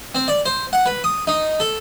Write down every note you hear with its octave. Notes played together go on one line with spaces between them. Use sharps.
C4
D5
C5
F#5
B4
D#6
D#4
A4